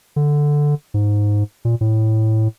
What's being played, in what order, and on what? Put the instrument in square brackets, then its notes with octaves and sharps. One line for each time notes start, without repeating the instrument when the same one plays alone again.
[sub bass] D3
G#2
A#2
A2